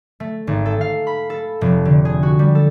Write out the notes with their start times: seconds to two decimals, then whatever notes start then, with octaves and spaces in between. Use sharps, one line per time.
0.20 A3
0.47 G#1
0.66 A4
0.81 F5
1.07 B5
1.30 A4
1.61 F1
1.85 D3
2.05 G#4
2.23 F#4
2.39 G3
2.55 A4